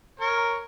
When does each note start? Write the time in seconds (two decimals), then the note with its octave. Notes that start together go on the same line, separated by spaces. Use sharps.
0.20 A#4 C#5